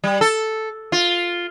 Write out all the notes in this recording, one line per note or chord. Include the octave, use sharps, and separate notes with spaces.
G3
A4
F4